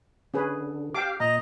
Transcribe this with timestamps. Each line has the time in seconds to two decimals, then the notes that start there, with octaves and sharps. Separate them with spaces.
0.34 D3 C#4 G#4 B4
0.95 G4 F5 G5 A5 D6
1.20 A#2 D#5 A#5